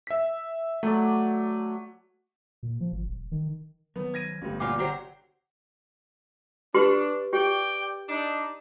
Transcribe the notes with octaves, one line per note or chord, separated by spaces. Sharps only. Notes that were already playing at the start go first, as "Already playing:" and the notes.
E5 B6
F#3 A3 D5
A#2
F3
G1
D#1
D#3
D#3 F#3 B3
G#6 A#6 D#7
G1 G3 A3 C#4
A#2 F4 D5 F#5 D6
D3 F#3 F#4 G4 C5 C#5 G5
D4 G4 B4 C6
G4 D5 G5
D4 D#4